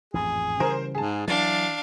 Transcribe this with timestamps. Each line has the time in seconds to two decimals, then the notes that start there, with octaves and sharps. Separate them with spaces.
0.14 A1 F2 G#2 G#4
0.60 C#3 E3 G3 A#4 C5
0.95 G#2 G#4 A5
1.28 E3 F#3 D4 F5 A6